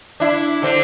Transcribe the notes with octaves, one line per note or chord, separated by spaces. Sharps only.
D4 E4
D3 C4